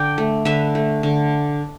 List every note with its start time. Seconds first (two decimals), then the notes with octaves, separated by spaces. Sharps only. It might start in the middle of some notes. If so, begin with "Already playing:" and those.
Already playing: D3 D5 G5
0.18 A3
0.45 D3 B4 E5
0.75 A3
1.03 D3